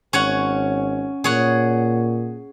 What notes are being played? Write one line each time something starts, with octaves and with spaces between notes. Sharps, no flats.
G#1 C#4 C#5 F#5
A#2 G#4 C#5 F#5